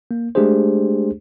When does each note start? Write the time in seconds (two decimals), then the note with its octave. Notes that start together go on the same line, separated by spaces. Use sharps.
0.11 A#3
0.35 G#3 A3 D4 G4 G#4 C5